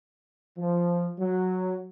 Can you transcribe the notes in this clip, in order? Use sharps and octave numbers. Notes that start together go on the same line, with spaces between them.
F3
F#3